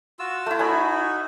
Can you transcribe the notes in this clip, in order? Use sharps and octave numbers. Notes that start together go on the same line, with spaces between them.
F4 F#4 E6
A3 E4
D#4 F#4 G#5 B5